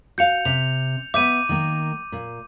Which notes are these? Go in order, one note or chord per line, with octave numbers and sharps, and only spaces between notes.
F#4 F5 G6 C#7 F7
C3 F7
B3 E5 D6 G6 D#7
D#3 A#3
A#2